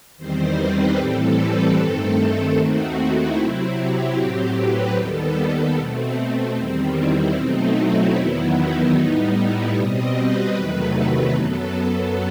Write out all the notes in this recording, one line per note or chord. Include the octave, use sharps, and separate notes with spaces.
E2 D#3 G3 C4 C5
B4
A2 E3 G3 C4 A4
B4
G2 D#3 A3 C4 A4
D#2 D#3 A3 C4 F#4
E4
C3 F#3 C4 E4
G4
A2 F#3 C4 G4
B4
D#2 D#3 G3 B3 A4
B2 A3 C4
E2 D#3 G3 C4
E4
B2 F#3 A3 C4 D#4
E4
E2 D#3 F#3 B3
D#4
A2 G3 B3
E4
B2 G3 C4 D#5
B4
E2 C3 D#3 F#3 A3
F#2 F#3 B3 A4